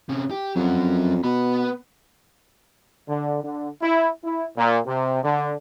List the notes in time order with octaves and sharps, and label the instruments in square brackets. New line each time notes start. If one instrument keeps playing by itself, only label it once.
[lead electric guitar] C3 C#4
G4
[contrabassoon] F2 [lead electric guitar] F#3 C#4
[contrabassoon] B2 [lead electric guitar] B3 B5
[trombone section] D3
D3
E4
E4
A#2
C3
D3